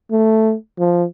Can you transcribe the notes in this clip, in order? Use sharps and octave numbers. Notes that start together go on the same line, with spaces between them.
A3
F3